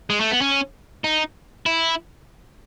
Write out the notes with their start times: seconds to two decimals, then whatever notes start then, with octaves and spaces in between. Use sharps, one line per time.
0.10 G#3
0.20 A3
0.31 B3
0.41 C#4
1.04 D#4
1.66 E4